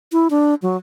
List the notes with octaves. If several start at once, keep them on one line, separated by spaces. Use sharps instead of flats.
E4
D4
F#3